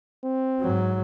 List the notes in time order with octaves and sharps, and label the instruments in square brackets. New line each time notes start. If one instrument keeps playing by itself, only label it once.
[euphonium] C4
[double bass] G#2 F#3